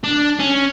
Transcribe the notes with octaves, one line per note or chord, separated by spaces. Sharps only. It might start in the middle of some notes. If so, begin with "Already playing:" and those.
D4
C#4